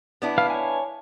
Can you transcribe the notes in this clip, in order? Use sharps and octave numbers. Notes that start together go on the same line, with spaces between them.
B3 D4 E4
B4 F5 F6
C#5 G#5